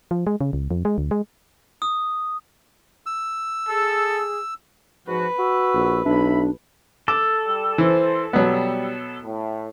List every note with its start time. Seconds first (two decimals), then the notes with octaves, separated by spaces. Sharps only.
0.11 F3
0.27 G#3
0.41 C#3
0.53 C#2
0.71 F2
0.85 G#3
0.98 D2
1.11 G#3
1.82 D#6
3.06 E6
3.69 G#4 A4
5.08 G#2 F3 F#4 B4
5.39 F#4 E6
5.74 A#1
6.06 B1 D4 E4 E5 B5
7.08 A4 D6
7.47 G3
7.78 E3 C5
8.33 B2 F#3 G3 B3
9.23 A2